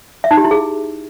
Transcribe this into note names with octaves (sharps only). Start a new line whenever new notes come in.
E5
D#4
G4
E4
G#4